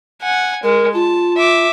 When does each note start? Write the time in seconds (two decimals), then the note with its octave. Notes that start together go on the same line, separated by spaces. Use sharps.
0.22 F#5 G#5
0.63 G#3 A#4
0.95 F4 A5
1.37 E5 D6